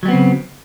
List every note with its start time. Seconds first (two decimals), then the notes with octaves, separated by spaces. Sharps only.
0.03 F#3
0.05 G3
0.08 B3
0.11 C4
0.13 C#3